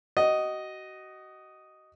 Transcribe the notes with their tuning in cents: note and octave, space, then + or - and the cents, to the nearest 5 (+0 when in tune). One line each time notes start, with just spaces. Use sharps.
F#4 +30 D#5 +0